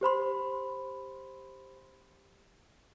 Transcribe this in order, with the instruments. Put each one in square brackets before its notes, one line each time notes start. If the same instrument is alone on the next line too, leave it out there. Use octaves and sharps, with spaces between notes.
[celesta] G4 C5 B5 C6